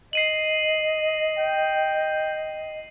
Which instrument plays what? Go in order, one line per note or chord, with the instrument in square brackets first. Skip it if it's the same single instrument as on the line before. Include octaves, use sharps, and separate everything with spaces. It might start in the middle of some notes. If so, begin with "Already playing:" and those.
[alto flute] D#5 [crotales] C7 D#7 F#7
[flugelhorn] G5